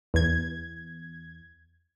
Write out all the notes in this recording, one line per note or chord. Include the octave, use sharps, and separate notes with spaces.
E2 G#6